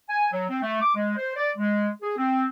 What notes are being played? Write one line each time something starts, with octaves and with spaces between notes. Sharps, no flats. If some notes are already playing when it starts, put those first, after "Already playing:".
G#5
F#3
C4
A3
D6
G#3
C5
D5
G#3
G#4
C4